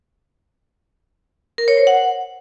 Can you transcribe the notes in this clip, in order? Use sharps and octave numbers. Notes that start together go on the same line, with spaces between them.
A#4
C#5
C5
F#5